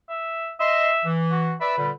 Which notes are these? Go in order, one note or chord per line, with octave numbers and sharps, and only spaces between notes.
E5
D#5 E5 C6
E3
F#4
B4 D5 E5
A#2 D3 G3